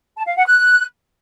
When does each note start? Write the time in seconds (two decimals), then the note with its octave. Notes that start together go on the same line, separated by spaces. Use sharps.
0.17 A5
0.26 F5
0.36 F#5
0.46 F#6